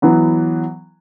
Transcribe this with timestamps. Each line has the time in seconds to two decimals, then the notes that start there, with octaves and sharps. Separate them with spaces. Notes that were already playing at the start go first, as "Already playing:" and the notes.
0.02 E3 F#3 B3